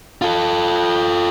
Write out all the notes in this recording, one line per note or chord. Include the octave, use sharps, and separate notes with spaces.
F4 A4